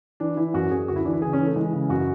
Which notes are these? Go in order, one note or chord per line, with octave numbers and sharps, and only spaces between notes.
E3 D4
E3 E4
F#2 F#4
F#2 G#4
D2 F#4
E4
E3 D4
E4
C#3 G#4
C#4
E3
A3
E3 G#3
C#3
F#2 F#4